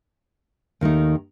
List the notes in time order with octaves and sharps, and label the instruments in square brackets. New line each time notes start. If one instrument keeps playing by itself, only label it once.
[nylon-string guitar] D#2 D#3 A3 D#4